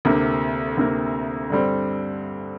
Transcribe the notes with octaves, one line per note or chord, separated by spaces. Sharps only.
D2 C3 A#3
D2 C3 A#3
G2 D3 G3 C4